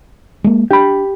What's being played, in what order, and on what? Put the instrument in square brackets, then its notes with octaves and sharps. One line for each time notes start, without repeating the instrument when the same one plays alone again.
[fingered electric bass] G#3 A#3
[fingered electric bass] D4 [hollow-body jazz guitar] G4 B5